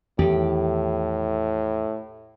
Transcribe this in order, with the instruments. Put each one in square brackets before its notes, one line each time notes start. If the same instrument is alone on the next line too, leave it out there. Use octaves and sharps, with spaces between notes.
[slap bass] E2 D#3 [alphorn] A2 [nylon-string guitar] G4